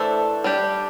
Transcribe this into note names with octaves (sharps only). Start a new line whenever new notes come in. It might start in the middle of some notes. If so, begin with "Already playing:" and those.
Already playing: E3 A3 D4 A4 C5
G3 D4 G4